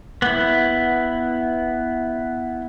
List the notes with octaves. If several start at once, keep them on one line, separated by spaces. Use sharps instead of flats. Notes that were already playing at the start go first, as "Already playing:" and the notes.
B3 E4